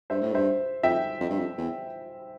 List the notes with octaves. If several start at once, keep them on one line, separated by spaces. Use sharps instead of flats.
G2 C5 E5
A2
G2 C5 E5
F2 E5 G5
F2
G2
F2
E2